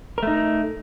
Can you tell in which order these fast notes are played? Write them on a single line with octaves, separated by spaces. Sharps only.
A#4 A3 D#4